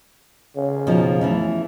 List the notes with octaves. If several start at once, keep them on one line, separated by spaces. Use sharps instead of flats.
C#3
B2 F3 D#4
E3 A3 C#4